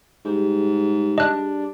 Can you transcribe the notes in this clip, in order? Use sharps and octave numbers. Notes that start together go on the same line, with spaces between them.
G#2 G3 G4 G#4
D4 D#5 F#6